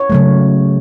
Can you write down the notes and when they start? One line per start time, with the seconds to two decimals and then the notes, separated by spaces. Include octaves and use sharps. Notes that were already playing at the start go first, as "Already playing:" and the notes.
Already playing: C#5
0.10 C#3 F#3 A3